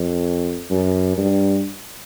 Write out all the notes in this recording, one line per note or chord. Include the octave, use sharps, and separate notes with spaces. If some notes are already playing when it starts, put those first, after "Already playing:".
Already playing: F2
F#2
G2